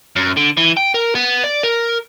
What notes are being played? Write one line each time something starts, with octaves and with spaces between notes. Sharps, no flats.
F#2
D3
E3
G5
A#4
B3
D5
A#4